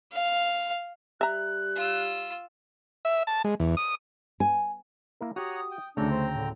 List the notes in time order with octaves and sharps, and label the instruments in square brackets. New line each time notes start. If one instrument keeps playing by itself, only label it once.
[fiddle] F5
[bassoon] G3 [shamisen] E5 A#5 [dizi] F#6
[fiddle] F4 E6
[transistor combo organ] E5
A5
G#3
E2
D#6
[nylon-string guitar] G#5
[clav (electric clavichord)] A#3 E4 A#4
[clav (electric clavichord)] F#4 G4 [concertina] C#5 F#5 A#5 [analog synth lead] D#6
[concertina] G5
[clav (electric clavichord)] D2 C#3 [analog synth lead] A3 [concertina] C4 G5 A#5 [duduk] D4
[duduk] C5
[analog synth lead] A2 [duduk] D3